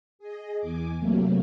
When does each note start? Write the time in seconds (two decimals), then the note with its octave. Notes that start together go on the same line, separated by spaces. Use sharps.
0.19 G#4 D#5
0.59 E2 G#5 D6
0.99 C3 F#3 A3 A#3